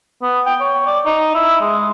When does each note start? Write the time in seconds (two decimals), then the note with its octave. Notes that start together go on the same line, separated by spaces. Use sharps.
0.22 B3
0.46 G5
0.61 C#5
0.87 D5
1.06 D#4
1.35 E4
1.61 G#3